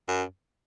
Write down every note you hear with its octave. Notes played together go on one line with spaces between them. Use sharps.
F#2